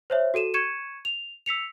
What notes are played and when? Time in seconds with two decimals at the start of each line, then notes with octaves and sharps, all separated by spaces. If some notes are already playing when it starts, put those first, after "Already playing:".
0.10 C5 C#5 E5
0.34 F#4 A4 D#7 E7
0.54 C#6 G#6 C#7 D#7 E7
1.05 F7
1.46 E6 B6 C#7 F7